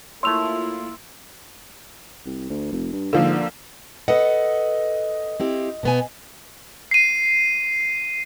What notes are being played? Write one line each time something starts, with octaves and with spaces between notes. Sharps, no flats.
A3 A#3 E4 F4 C#5 C6 E6 F7
C2
D2
F1
G2
G#2 D3 F3 A#3
A4 B4 D#5 F#5
C4 E4 G4
B2 B3 G#5
C7 D#7